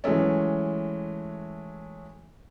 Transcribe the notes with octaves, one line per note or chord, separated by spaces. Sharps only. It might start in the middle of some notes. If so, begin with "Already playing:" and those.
E3 F#3 G#3 A3 C#4